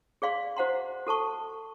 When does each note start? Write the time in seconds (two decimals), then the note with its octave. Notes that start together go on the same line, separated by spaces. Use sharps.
0.22 G#4 D5 F5 C6
0.56 F#4 C5 F5 F#5 A#5 C6
1.07 F#4 A4 A5 C#6